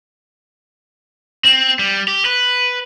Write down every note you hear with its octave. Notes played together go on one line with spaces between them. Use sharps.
C4
G3
G4
B4